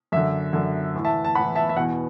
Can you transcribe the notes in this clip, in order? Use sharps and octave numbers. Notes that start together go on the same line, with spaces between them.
F#2 D3 E5
F#2 D3
A2 E3
E5 A5
A5
A2 E3 F#5 B5
E5 A5
E5
E2 B2 F#5